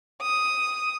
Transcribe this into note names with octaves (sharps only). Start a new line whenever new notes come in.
D#6